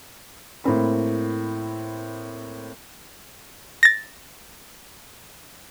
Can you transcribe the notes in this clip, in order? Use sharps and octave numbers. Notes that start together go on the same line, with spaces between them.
A2 A#3 C4 B5
A6 A#6